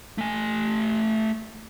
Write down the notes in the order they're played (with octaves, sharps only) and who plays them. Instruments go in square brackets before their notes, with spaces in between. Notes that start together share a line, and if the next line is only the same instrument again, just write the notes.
[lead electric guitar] A3 G#5